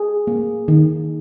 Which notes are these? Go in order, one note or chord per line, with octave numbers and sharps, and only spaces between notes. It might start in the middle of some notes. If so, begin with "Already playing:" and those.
Already playing: G#4
A#3
D#3